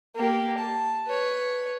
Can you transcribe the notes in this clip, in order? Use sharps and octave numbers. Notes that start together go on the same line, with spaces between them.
A#3 G4
A5
B4 C#5